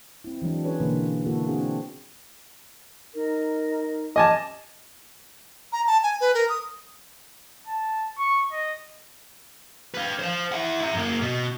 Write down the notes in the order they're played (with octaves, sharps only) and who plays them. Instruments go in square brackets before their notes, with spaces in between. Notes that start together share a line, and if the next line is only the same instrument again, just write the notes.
[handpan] C4 E4
E3 F#3 G#3 D4
C#4 F4 G#4 B4 C#5
B2 D3 E3 A#3
D3 A#3 B3 E4 F#4 A4
C4 D4 F#4 G#4
[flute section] D#4 A#4
[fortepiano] D#5 G#5 A5 [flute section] D6 F6
[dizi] A#5
A5
G#5
B4
A#4
D#6
[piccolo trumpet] A5
C#6
D#5
[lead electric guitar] B4 F5
C5 F5
E4 F#5
E5 A#5
F#2 A#3
B2